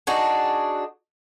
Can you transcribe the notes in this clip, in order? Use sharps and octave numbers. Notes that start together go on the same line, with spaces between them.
D4 D#4 F#4 G#4